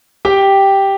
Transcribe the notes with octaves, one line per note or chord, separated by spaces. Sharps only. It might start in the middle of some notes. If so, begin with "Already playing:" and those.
G4 G5